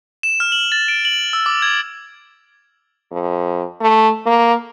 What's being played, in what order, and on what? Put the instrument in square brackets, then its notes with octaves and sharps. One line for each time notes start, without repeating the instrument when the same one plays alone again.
[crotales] E7
F6
F#7
A6
D7
F#7
E6
D6
G#6
[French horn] F2
A3
A#3